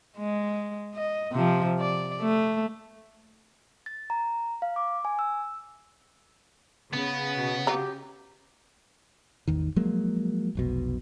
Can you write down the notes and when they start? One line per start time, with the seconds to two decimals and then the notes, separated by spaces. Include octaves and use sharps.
0.17 G#3
0.94 D#5
1.32 C3 F3
1.80 D5
2.21 A3
3.86 A6
4.10 A#5
4.62 F5
4.76 D6
5.05 G#5
5.19 E6
6.93 C#3 B3
7.33 B2
7.67 F#3 F4 G4 A#5
9.48 A1 E2 D#3
9.76 F3 F#3 G#3 A#3
10.55 F1 B1 B2